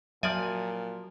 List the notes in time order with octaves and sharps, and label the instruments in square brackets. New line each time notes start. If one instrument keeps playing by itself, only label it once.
[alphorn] A#2 [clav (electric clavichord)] F3 D5 G#5 [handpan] F#3 [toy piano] E5